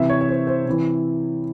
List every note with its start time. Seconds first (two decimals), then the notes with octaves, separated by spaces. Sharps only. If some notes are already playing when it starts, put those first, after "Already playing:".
Already playing: C3 E3 E5
0.09 C#5
0.21 C#5
0.29 C5
0.47 C5
0.66 C3 E3